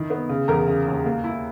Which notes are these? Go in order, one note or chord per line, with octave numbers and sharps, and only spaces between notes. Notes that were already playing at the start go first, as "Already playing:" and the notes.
Already playing: D#3 E4
B3
C#3
E2 A#4 A#5
C#3
D#2
A#3
E4